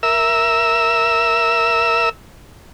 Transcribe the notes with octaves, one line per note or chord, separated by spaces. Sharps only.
A#4 E5 E6